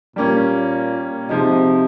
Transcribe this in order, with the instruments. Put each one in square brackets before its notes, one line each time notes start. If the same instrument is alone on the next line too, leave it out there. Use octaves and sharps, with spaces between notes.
[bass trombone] A#2 [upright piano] G3 A#3 C#4
[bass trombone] C3 [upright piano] F3 G#3 D#4